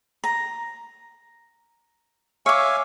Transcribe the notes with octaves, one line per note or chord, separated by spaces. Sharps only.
A#5
C#5 E5 F5 G#5 D6